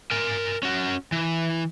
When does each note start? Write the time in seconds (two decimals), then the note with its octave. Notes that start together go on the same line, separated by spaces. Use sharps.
0.11 A#4 G#5
0.63 C#4 F#4
1.12 E3